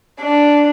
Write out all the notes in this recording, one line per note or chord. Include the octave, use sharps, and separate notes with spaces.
D4